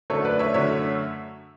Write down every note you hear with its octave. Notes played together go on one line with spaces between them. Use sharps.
F#2 D3 A3 A4 C#5
B4 D5
C#5 E5
F#2 D3 A3 C#5 E5